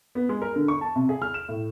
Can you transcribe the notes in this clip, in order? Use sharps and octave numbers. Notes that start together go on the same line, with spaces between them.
B3
G#3
A#4
D3
C#6
A5
C3
G#4
F6
E7
A2